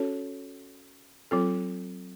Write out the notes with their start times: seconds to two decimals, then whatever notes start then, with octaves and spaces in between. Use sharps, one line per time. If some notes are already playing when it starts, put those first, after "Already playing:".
Already playing: C#4 F#4 A4 C#5
1.31 F#3 C4 F4 A4